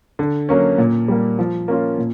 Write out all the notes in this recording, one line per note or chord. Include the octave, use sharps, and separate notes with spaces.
D3
F#3 A#3 C#4
A#2
G3 A#3
F3
A#3 C#4 F4
A#2